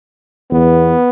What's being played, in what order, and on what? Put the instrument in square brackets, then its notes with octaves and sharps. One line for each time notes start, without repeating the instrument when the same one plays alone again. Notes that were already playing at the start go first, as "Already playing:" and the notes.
[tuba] E2 [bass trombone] B3